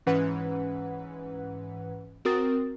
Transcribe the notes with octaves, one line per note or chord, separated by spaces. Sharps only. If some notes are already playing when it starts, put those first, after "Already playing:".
G#2 E3 C#4 B4 F#5
C4 F#4 A#4 D#6 A6